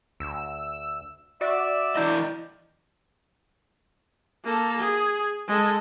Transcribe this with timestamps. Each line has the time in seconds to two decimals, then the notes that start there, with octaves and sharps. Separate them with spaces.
0.20 D2 E6
1.41 F#4 D5 E5
1.96 E3 E4 D#5
4.44 A#3 A4
4.79 G#4
5.47 G#3 A4